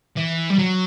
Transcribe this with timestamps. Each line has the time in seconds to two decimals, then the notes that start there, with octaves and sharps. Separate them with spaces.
0.17 E3
0.50 G3
0.59 F#3